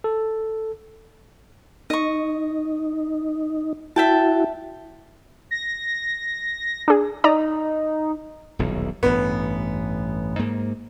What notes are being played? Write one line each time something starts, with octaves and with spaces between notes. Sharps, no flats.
A4
D#4 D#5 C#6
E4 F#4 E5 G5 A5
A#6
D4 G#4
D#4 D5 A#5 D#6
D#1 B1 E2
A1 G2 B3
G#2 A#3